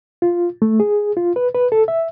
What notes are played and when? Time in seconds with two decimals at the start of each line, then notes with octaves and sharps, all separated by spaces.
0.22 F4
0.62 A3
0.80 G#4
1.17 F4
1.36 B4
1.55 B4
1.72 A4
1.88 E5